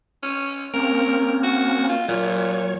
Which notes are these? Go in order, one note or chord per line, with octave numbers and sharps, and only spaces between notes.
C#4
A#3 C4 C#4 A#4
F#4
F4
A#2 F#3 C#5